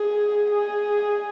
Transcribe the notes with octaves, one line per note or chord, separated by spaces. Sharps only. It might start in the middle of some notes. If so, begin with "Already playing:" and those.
Already playing: G#4
G#4